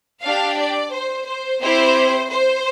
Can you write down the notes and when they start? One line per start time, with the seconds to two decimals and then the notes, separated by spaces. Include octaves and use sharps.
0.23 D4 G4 F5
0.58 D5
0.93 C5
1.27 C5
1.61 C4 E4 G4 C5
2.31 C5